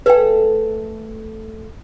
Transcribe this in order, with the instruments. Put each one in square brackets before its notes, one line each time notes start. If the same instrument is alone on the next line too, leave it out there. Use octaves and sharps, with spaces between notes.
[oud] A3 G#4 A4 [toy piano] B4 G5